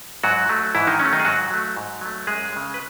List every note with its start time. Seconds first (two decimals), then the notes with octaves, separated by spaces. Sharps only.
0.23 G#2 F#3 F#4
0.49 F#3 A3
0.75 G#2 E3 E4
0.87 D#3 D#4
0.99 F#3 A3 C#4
1.13 D#3 D#4
1.20 G#4
1.25 G#2 F#3 F#4
1.51 F#3 A3
1.76 G#2
2.01 F#3 A3
2.27 F#2 G#3 G#4
2.53 C#3 G#3
2.74 B4